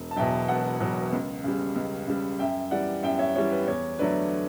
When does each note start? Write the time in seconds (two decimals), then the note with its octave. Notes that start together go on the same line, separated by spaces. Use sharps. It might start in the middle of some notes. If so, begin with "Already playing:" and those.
Already playing: E1
0.11 A5
0.16 E2 B2 F#3 E5 G5
0.48 E1 F#5 A5
0.80 E2 B2 F#3
1.12 C#2
1.44 C#3 G3
1.76 C#2
2.07 C#3 G3
2.39 F#2 E5 G5
2.71 E3 G3 D5 F#5
3.03 F#2 E5 G5
3.19 C#5 E5
3.35 E3 G3 C#5
3.52 B4
3.67 E2 C#5
3.99 D3 F#3 A3 B4 D5